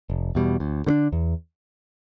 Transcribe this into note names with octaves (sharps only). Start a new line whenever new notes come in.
F1
E2 B2 G3
D2
D3 A3 D4
E2